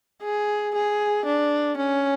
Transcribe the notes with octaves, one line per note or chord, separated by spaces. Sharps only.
G#4
G#4
D4
C#4